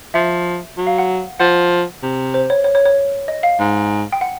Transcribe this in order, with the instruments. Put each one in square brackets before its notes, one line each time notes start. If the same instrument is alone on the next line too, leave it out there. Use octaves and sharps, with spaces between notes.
[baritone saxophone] F3 [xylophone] E5
[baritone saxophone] F#3
[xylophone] F5
F#5
[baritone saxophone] F3 [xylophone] F#5
[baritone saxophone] C3
[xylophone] C5
C#5
C#5
C#5
C#5
D#5
F5
[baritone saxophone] G#2
[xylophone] G5
F#5